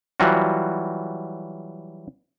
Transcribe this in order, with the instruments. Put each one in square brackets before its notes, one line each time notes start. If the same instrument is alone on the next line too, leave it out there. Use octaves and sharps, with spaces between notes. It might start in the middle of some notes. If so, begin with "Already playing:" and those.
[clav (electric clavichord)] E3 F#3 G3 F4 F#4